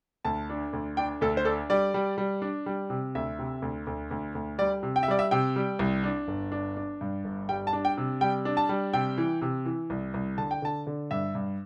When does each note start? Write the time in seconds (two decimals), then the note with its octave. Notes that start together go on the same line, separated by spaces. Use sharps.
0.25 D2 A5
0.50 D4
0.73 D2
0.97 D4 G5
1.21 D2 A4
1.37 C5
1.45 D4 A4
1.70 G3 D5
1.94 G3
2.18 G3
2.42 D4
2.66 G3
2.90 C3
3.15 D2 E5
3.39 C3
3.62 D2
3.87 D2
4.11 D2
4.35 D2
4.59 G3 D5
4.83 C3
4.96 G5
5.03 E5
5.08 G3 D5
5.19 E5
5.31 C3 G5
5.56 G3
5.79 C2
6.04 D4
6.28 G1
6.52 D4
6.76 D4
7.01 G2
7.25 G1
7.49 G3 G5
7.67 A5
7.73 D4
7.85 G5
7.98 C3
8.21 G3 G5
8.45 D4
8.57 A5
8.69 G3
8.93 C3 G5
9.18 E3
9.42 C3
9.66 E3
9.90 C2
10.14 C2
10.38 D3 A5
10.51 G5
10.62 D3 A5
10.87 D3
11.11 G2 E5
11.35 G2